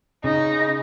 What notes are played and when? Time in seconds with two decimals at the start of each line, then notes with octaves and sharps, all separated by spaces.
0.24 C#3 D#4